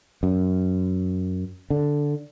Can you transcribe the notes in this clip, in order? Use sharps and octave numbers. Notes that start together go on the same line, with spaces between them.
F#2
D3